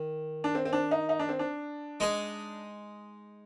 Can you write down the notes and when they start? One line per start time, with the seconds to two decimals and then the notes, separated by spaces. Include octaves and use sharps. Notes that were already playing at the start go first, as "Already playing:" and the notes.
Already playing: D#3
0.44 D4
0.55 C4
0.65 C4
0.73 D4
0.91 D#4
1.09 D#4
1.19 D4
1.29 C4
1.39 D4
2.00 G#3 D#4 G#4